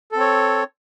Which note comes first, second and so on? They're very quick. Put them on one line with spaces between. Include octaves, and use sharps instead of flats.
A4 C4 C#5